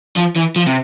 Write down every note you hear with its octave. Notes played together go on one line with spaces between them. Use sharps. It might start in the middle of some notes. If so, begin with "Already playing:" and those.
F3
E3
F3
C3